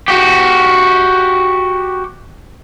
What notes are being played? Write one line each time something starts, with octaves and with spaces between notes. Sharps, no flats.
F#4 G4